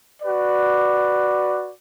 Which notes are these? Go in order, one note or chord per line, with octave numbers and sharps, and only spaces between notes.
F#4 B4 D5